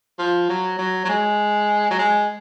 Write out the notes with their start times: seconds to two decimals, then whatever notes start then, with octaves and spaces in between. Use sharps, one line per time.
0.19 F3
0.49 F#3
0.78 F#3
1.05 F#3
1.09 G#3
1.91 F#3
1.99 G#3